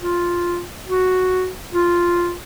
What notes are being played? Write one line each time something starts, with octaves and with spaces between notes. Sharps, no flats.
F4
F#4
F4